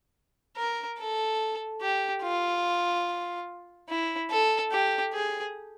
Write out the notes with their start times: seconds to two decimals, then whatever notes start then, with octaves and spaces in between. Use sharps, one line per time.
0.57 A#4
0.98 A4
1.81 G4
2.22 F4
3.89 E4
4.30 A4
4.71 G4
5.13 G#4